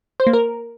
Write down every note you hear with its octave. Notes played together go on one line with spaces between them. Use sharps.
C5
A#3
A#4